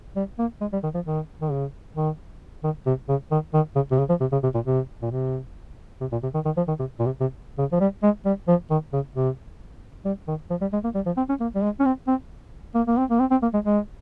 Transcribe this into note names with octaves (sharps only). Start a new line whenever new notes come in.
G3
A#3
G#3
G3
D#3
F3
D#3
D#3
C#3
D#3
D#3
C3
C#3
D#3
D#3
C#3
C3
C#3
F3
C3
C#3
C3
A#2
C3
A#2
C3
C3
A#2
C3
D#3
D#3
F3
D#3
C3
A#2
C3
C3
C#3
F3
G3
G#3
G3
F3
D#3
C#3
C3
G3
D#3
F3
G3
G#3
A#3
G3
F3
C4
C#4
A#3
G3
G#3
C#4
C4
C4
A#3
A#3
C4
A#3
C4
C4
A#3
G#3
G#3